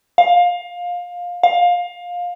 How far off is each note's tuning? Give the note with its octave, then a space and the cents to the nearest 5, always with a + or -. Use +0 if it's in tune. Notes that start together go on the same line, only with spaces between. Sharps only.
F5 +20
F5 +20